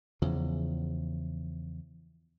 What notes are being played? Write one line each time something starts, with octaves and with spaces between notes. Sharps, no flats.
E2 C#3 F3